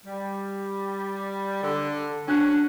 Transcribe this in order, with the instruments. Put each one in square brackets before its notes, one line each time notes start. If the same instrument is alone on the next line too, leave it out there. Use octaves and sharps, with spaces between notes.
[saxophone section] G3
D3
[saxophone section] C#4 F#4 [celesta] D4 F#6